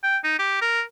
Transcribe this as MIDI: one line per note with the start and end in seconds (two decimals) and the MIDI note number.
0.03 0.18 79
0.24 0.38 63
0.39 0.60 67
0.61 0.82 70